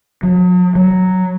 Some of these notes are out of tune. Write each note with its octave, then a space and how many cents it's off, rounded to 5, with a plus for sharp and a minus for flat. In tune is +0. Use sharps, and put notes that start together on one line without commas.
F#3 -40
F#3 +5